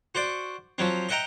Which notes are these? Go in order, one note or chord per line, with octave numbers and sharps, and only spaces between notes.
F#4 C5 D5
F3 F#3 C4
D#5 E5 F#5 G5 A#5